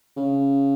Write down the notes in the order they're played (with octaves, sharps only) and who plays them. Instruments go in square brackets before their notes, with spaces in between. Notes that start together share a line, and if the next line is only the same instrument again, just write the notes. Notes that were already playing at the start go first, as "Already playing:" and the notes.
[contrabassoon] C#3